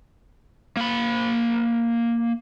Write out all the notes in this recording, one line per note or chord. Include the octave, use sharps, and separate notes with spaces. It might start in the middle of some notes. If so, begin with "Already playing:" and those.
A#3 B5